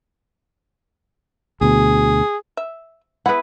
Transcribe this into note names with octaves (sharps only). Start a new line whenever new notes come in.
D2 B2 G#4
E5
B3 E4 G#4 B4 F#5